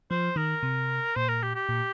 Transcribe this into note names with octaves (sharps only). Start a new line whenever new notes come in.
F3 C5
D#3 A#4
C3
A#2 C5
A#4
G4
G4
A#2